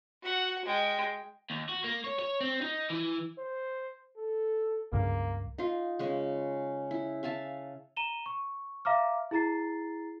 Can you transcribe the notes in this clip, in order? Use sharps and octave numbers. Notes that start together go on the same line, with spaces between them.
F#4 F#5
G#3 G5
D#2
F#4
A#3
C#5
C#5
C4
D#4
E3
C5
A4
C#2 G2 C#3 A#3
D#4 F4
C#3 G#3 C#6
E4
E5 F5 G#5 A5
A#5 D#7 E7 G7
C#6
E5 F5 A#5 D6 F6
E4 G#4 A#5 A6 C7